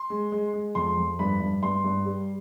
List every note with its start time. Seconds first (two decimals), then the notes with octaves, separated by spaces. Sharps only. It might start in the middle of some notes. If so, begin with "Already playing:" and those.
Already playing: C6
0.10 G#3
0.32 G#3
0.54 G#3
0.75 F2 C6
0.97 F2
1.19 G2 B5
1.40 G2
1.62 G2 C6
1.84 G2
2.06 G3